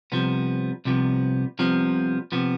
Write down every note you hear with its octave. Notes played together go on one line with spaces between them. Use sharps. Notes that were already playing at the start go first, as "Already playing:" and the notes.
C2 C3 F3 B3
C2 C3 F3 B3
C2 C3 F3 B3
C3 F3 B3